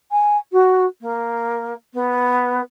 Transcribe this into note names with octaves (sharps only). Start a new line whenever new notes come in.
G#5
F#4
A#3
B3